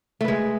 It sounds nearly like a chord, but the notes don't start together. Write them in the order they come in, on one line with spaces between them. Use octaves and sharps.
A3 B4 G#3